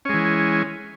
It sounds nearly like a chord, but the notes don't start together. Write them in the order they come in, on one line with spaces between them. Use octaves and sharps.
C#4 G#3 E3